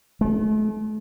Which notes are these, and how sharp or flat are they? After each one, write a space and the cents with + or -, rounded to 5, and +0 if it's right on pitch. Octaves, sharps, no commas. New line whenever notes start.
A3 -40